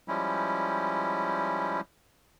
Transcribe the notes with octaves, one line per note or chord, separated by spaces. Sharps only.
F3 G3 G#3 C#4 E4